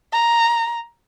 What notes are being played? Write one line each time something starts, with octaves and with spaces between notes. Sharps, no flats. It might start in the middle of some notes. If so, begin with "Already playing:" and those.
A#5